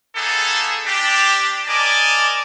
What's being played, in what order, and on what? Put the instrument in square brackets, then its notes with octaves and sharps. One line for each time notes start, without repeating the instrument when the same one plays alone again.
[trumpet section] A#3 B3 D#4 G#4 A4
D4 G4
A#4 D5 D#5 G#5 A5 D6